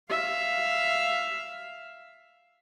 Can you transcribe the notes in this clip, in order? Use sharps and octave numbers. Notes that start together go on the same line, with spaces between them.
E5 F5